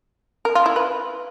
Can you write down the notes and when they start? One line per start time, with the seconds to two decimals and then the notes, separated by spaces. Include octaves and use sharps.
0.45 A#4
0.55 F4
0.66 E4
0.76 B4